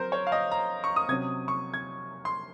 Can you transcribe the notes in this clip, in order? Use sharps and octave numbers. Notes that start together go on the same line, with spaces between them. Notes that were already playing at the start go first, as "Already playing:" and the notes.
Already playing: F#3 C4 A#4 C5
C#5
F5
D#5
A#5
C#6
D#6
C3 F#3 C#4 G#6
C#6
G#6
C6